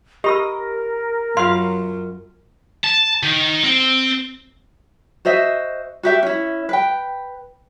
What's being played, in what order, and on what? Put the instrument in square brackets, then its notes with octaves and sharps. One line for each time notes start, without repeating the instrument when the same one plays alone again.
[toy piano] G4 B5 E6 [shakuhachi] A#4 [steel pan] D#5
[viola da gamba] F#2 F#3 [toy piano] F4 C6 [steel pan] F5
[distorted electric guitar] A5
D#3
C4
[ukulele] F#4 C5 D#5 E5
F#4 G4 E5
C#4 E4
B4 G5